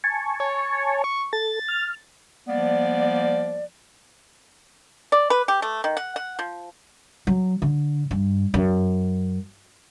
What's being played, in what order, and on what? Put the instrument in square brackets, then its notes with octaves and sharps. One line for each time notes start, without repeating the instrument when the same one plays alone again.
[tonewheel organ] G#5 A5 C#6
[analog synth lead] C#5
C#6
[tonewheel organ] A4 [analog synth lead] A6
[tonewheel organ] F6
[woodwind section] F3 G3 A#3 B3 D5
[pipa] D5
B4
G4
A3
D#3
F#5
F#5
F3
[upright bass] F#3
D3
G2
F#2